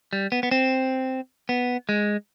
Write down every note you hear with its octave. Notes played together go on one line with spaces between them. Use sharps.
G3
B3
B3
C4
B3
G#3